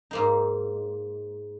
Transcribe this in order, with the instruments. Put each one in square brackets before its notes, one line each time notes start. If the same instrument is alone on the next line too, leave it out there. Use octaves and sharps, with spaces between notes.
[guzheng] G#2 A#3 D#4